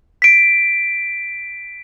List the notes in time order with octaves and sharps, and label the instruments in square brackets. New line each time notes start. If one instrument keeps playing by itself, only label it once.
[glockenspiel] B6 D7